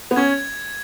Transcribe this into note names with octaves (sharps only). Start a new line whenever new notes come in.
B3
C#4 G#6